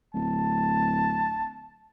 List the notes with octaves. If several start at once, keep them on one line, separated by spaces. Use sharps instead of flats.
D1 A5